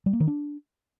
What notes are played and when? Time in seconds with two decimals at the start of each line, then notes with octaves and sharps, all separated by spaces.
0.06 G3
0.13 A#3
0.20 D#3
0.27 D4